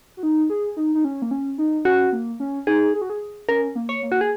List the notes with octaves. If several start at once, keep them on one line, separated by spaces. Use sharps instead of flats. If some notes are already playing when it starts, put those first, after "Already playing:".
F#4
D#4
G#4
D#4
D#4
C#4
A#3
C#4
D#4
C#4 F#4
A#3
C#4
D#4 G#4
G#4
F#4
G#4
C#4 A#4
A#3
C#5
A#3
F#4
G#4